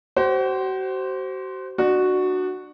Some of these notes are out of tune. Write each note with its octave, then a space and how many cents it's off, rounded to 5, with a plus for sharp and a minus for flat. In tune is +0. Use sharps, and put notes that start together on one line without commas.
F#4 +40 C5 +0
D4 +30 F#4 +0